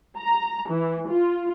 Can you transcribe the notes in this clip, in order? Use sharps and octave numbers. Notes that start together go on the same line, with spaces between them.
A#5
E3
F4